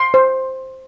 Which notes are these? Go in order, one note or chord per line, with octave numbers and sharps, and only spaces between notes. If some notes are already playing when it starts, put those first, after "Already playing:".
Already playing: C6
C5